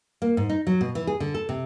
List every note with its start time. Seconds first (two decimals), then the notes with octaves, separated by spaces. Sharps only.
0.22 A#3
0.37 G#2
0.49 D#4
0.67 F#3
0.81 B2
0.95 E3
1.07 G#4
1.20 D3
1.34 A4
1.49 C3